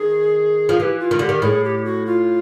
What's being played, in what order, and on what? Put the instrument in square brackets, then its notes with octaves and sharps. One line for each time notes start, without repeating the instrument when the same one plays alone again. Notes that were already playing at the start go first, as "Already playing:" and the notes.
Already playing: [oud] D#3 [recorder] G#4
[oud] F3
[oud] E3 [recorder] G4 G#4
[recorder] F4
[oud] D#3
[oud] D3 [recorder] G4
[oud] D#3
[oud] A2 [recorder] G#4
[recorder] G4
F#4
F4